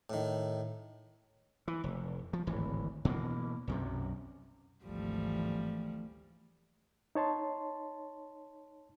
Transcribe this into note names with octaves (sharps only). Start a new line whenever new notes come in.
A2 D#3
E3
F1
F3
D1 G#1 E3
B2 E3 A#3
B1 F#2 C3
G#1 D2 E3 F3 G3 A3
D#4 C#5 A5 C6